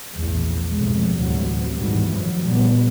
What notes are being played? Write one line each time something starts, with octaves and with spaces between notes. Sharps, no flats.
A#1 E2 A2
B1 F2 A2 C3 G#3
A1 D2 C3 F#3 G3
G#2 B2 D#3 E3 F#3 G3
F#2 A2 F3 F#3
A#2 C#3 G3 B3